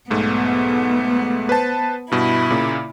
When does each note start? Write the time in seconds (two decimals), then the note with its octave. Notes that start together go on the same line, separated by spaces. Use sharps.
0.10 B1 G#2 A3 B3
1.49 B4 C5 A5
2.12 G2 B2 E4
2.50 A#2 C#3 A#3